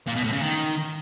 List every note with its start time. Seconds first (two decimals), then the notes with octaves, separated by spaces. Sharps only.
0.07 A#2
0.15 B2
0.24 A2
0.32 C#3
0.41 D#3